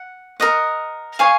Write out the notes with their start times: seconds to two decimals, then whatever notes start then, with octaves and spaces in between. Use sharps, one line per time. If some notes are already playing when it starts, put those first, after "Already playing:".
Already playing: F#5
0.40 A#4 D#5 F#5
1.19 G#4 C#5 F5 G#5